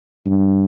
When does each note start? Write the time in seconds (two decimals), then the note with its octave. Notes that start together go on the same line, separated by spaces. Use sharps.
0.26 G2